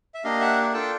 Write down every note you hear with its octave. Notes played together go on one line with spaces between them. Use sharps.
E5
A#3 D4 G4 D#5 F5
E5 F#5
D4 F4 A4 G5 A5